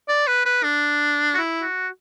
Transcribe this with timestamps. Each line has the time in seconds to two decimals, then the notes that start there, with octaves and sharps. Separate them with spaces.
0.08 D5
0.27 B4
0.45 B4
0.63 D4
1.34 F#4
1.38 E4
1.62 F#4